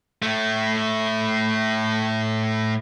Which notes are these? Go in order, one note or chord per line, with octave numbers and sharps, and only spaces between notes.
A2 A3